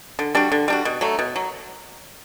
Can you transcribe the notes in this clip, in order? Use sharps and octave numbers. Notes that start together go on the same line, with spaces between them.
D3
G3 D4 F#4
D3
G3 D4 F#4
B2
F#3 A3
B2
F#3